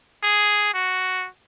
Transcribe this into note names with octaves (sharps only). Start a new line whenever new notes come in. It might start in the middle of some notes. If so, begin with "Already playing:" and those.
G#4
F#4